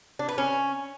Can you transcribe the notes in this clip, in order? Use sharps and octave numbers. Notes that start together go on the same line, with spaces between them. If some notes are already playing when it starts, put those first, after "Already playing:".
D4
B4
C#4